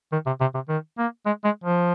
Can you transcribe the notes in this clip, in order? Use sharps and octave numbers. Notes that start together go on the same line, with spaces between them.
D#3
C3
C3
C3
D#3
A#3
G#3
G#3
F3